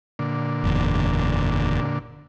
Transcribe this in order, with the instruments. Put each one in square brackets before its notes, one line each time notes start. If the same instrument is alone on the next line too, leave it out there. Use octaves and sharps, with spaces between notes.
[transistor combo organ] A#2 D3
[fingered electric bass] F#1 E2